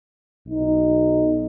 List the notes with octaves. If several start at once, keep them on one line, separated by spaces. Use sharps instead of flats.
B1 D#4